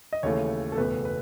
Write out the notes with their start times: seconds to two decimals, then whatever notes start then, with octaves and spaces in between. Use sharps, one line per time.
0.13 D#5
0.23 D#2 C#3 E3 A3 C#5
0.72 A4
0.77 F#1 E2 B2 A3 B4
1.05 B4